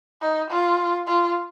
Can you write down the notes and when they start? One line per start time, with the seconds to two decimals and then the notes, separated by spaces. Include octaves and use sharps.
0.22 D#4
0.51 F4
1.07 F4